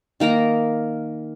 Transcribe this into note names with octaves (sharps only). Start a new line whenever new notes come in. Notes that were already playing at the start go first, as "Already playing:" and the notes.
D#3 A#3 A#4 A#5